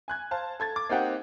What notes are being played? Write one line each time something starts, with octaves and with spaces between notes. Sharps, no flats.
G#5 F#6 G#6
C5 F5 A5
A4 G#6 A6
D6
A#3 C4 D#4 G4 F#5 G5